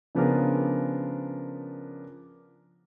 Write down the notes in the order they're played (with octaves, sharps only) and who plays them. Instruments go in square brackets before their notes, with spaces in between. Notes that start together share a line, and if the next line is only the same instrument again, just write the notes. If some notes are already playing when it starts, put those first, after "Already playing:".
[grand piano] C#3 F3 B3 D4 G#4 A#4